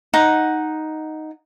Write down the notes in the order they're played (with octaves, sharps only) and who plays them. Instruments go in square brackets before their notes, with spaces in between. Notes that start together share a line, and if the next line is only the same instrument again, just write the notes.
[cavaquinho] D#4 F#5